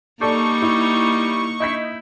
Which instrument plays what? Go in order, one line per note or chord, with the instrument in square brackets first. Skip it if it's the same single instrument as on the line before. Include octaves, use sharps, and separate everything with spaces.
[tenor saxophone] G3 [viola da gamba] A#3 D#4 [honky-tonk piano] A4 D5 [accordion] C#6
[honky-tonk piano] E4
[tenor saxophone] E4 [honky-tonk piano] D#5 G6 B6